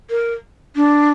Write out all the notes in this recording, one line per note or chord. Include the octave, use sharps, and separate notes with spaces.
A#4
D4